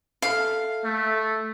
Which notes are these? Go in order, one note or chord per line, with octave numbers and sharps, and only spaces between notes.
A4 E5 F5
A3